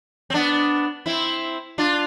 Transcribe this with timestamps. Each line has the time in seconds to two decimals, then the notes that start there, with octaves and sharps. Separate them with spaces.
0.30 C4
0.34 B3 D4
1.06 C4 E4
1.78 D4 F4